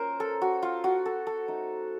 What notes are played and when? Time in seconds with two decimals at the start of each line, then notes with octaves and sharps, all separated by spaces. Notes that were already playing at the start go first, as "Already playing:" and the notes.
Already playing: A#3 C#4 F4 A#4 C5
0.20 A4
0.42 F#4
0.62 F4
0.84 F#4
1.06 A4
1.27 A4
1.48 A3 D#4